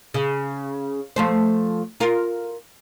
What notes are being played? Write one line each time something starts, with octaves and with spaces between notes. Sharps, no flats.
C#3
F3 A3 C5
F4 A#4